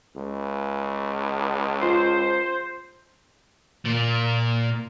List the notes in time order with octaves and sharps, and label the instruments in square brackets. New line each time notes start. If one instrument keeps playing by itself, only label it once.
[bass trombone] C#2
[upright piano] F4 [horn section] C5
[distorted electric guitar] A#2